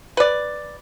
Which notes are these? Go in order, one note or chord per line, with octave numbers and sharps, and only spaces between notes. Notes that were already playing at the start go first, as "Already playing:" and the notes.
B4 D5